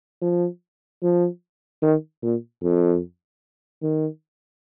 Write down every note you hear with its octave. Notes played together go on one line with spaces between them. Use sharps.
F3
F3
D#3
A#2
F2
D#3